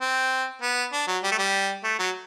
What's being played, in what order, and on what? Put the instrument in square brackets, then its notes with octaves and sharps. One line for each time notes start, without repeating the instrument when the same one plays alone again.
[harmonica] C4
B3
D4
F#3
G3
A3
G3
A3
F#3